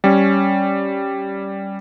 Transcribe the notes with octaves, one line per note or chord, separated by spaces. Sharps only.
G3 C#4